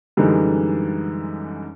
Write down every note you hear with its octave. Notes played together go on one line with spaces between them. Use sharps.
F#2 D3 E3 G3 G#3 D#4